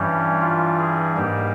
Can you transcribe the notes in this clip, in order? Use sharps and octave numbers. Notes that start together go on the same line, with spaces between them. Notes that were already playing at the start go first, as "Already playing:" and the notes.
Already playing: G2 E3 G3 C#4
F4
G#4
G#2 G3 A#3 G4